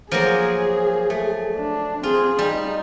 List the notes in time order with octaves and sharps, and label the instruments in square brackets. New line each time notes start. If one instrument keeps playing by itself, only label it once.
[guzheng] F3 F#3 A#3 [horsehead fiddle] G#4
[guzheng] A3
[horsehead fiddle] D4
[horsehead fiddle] C4 G#4 [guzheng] F4
[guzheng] G3 [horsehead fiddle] D#4